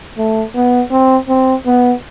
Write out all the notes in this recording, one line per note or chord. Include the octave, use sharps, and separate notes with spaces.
A3
B3
C4
C4
B3